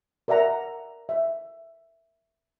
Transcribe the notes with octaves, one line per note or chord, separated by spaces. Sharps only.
A#4 D5 E5 F#5 A#5
E5